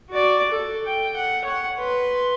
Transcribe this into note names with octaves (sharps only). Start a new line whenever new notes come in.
F#4 D5
A4
G5
F#5
C#5 F#5
B4 C6